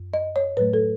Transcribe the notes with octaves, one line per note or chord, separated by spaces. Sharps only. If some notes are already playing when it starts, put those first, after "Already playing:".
Already playing: F#2
D#5
C#5
A2 F#3 A3 B4
A4